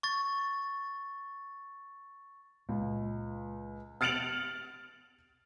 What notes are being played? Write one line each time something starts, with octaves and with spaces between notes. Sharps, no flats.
C#6 A6
C#2 A#2
F6 A6 C#7 D7 F7 F#7